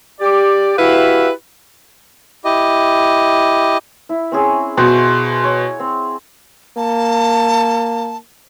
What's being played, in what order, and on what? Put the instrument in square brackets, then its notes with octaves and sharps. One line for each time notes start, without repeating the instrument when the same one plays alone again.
[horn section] G4 D5
E4 F#4 G4 B4 E5 F5
[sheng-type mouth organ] E4 G4 D#5
[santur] E4
C4 C#4 G#4
[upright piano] B2 [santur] C5 F#5 C#6
[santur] C#5
C4
[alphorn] A#3 [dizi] A5